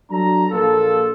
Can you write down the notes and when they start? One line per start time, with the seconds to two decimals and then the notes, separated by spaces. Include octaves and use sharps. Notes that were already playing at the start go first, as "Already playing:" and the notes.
0.10 F#3 D4 A4 A#5
0.51 A#1 A#3 F4 A4